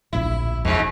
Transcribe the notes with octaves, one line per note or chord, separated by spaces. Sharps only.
D1 A#1 E4
E1 F2 G#2 B2